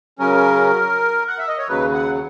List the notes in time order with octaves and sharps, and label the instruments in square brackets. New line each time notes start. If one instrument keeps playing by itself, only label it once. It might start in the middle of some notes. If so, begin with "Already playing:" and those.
[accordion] C#3 F#3 C#4 A#4
F#5
E5
D#5
C#5
D#2 C#3 F#3 B4
F#5